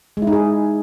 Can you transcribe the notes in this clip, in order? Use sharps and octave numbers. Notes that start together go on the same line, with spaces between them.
G#3
E4
D#4
G#4